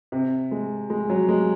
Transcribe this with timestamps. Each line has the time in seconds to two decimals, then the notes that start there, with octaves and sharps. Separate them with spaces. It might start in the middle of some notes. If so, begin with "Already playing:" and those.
0.12 C3
0.51 G#3
0.90 G#3
1.10 F#3
1.29 G#3